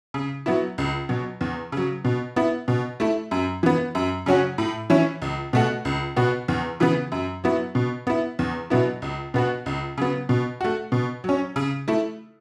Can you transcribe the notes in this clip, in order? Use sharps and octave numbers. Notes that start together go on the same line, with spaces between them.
C#3
F#3 B3 E4
C#2
B2 F#3
E2
C#3 F#3
B2
B3 E4
B2
A3 E4
F#2
E3 B3
F#2
C#3 F#3 C#4 F#4
A2
E3 C#4 E4
C#2
B2 A3 F#4
C#2
B2 B3 F#4
E2
C#3 E3 B3
F#2
F#3 B3 E4
B2
B3 E4
E2
B2 F#3 B3 E4
C#2
B2 B3 F#4
C#2
C#3 F#3 B3
B2
A3 F#4
B2
F#3 C#4
C#3
A3 E4